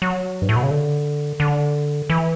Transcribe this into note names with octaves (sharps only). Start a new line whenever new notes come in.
F#3
G2
A2
B2
C#3
D3
D3
E3